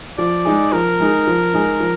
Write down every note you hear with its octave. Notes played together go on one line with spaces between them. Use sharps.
F3 D5
G#3 D#4 G#4
F3 A#4
G#3 D#4 G#4
F3
G#3 D#4 G#4
F3